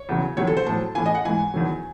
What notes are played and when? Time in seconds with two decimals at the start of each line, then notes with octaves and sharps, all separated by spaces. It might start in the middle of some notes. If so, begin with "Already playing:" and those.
Already playing: C#5
0.09 E2 C#3 F#3
0.37 E2 C3 D#3 F#3 C#5
0.47 A4
0.57 C5
0.67 A2 F#3 A5
0.95 A2 E3 G#5
1.06 D#5
1.15 F#5
1.25 G#2 E3 G#5
1.54 E2 D#3 F#3